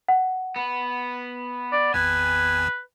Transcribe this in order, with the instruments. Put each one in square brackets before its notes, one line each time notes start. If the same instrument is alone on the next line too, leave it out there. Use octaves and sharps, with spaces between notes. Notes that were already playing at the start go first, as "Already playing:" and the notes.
[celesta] F#5
[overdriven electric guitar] B3
[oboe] D5
[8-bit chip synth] G#1 E2 [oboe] B4 [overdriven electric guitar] G#5